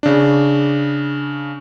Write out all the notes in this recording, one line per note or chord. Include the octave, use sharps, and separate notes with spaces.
C#3 D4